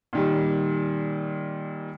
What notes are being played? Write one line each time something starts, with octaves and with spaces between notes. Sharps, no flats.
A#2 D#3 G3